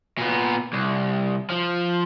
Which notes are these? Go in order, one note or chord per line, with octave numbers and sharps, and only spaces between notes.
A#2 B3
C2
F3